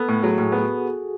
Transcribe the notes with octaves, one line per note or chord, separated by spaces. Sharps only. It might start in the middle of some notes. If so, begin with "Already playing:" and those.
Already playing: B3 A4
A2
F#3 G#4
A2 G#4
B3 F#4